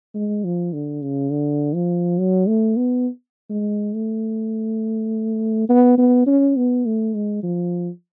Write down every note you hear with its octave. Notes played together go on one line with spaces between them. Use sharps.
G#3
F3
D3
C#3
D3
F3
F#3
A3
B3
G#3
A3
B3
B3
C#4
B3
A3
G#3
F3